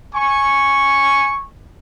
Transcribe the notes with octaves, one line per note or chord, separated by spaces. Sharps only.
G#5 C#6